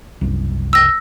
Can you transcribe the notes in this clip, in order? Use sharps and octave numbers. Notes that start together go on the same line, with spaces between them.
F#1 C2
E6 A#6